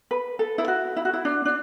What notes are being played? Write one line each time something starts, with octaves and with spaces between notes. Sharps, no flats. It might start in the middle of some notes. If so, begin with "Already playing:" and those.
B4
A4
E4
F#4
E4
F#4
E4
D4
D4